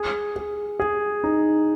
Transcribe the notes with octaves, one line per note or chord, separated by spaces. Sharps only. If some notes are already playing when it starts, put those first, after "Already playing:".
Already playing: G#4
G#4
G#4
D#4